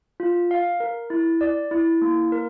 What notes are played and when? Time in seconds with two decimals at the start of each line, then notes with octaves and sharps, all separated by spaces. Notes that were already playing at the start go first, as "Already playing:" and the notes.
0.20 F4
0.51 F5
0.80 A#4
1.10 E4
1.41 D5
1.71 E4
2.02 A#3
2.32 A#4